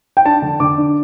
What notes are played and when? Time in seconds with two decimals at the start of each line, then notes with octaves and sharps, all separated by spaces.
0.17 G5
0.25 D4 A5
0.42 D3
0.60 D3 D6
0.78 D4